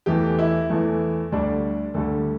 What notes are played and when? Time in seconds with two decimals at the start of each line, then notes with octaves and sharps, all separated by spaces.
0.06 E2 E3 A3 G4
0.39 E4
0.70 E2 E3 A3
1.32 D2 D3 G3 D4
1.94 D2 D3 G3 A4